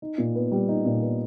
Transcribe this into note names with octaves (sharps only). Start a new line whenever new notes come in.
D#4
A#2
B3
G3
D#4
A#2
B3